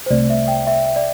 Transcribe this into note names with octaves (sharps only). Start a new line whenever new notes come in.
C5
C2 C3 A3 C4 D5
E5
G5
E5
D5